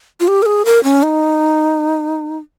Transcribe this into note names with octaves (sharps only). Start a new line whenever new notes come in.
F4
G4
A#4
G#4
A#4
C#4
D#4